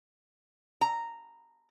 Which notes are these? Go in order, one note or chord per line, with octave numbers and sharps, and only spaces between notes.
A#5